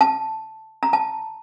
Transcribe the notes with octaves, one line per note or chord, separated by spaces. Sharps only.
A5
A#5
A5